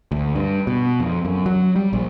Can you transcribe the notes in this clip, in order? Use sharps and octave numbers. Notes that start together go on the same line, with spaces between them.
D2
G2
B2
F2
F#2
F#3
G3
A#1